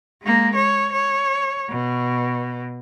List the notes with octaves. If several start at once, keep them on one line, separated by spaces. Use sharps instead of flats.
G#3 A#3
C#5
C#5
B2